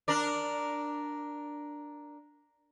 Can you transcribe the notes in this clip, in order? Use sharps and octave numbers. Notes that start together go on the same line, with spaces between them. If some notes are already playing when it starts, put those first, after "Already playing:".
D4 A#4 D5